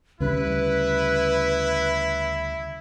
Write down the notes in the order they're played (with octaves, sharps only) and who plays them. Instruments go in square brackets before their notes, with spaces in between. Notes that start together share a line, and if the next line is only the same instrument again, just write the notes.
[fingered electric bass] D2 C#3 G3 [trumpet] E4 [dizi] B4